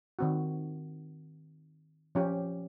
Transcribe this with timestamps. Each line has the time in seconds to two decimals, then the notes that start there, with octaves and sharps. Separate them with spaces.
0.19 D#3 C4 F#4
2.15 F3 C#4 G4